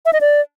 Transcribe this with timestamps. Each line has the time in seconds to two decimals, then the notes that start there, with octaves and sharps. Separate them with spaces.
0.06 E5
0.13 D#5
0.21 D5